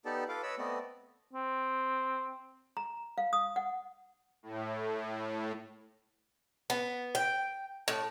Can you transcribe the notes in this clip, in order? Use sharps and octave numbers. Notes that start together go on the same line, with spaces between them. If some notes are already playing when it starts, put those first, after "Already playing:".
B3 D#4 G4 A4 D5 A5
F4 A4 B4 F5 D6
B4 C#5 D#5 B5 E6
A3 B3 C4 D5 D#5
C4
A#5
F5
D#6
F#5
A2
B3
G5
A2